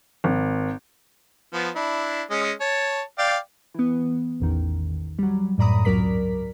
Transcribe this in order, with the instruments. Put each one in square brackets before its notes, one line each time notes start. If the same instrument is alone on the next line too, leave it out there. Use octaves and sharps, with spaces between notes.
[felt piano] G#1
[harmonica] F3 B3
D4 E4
G#3 C#4 D#5
C#5 A5
D5 F5 G5
[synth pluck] E3 B3
A1 E2 D#3
F#3 G3
F#2 A2 D5 A#5 B5 D#6
G#1 C#2 F#3 A#4 D5 B6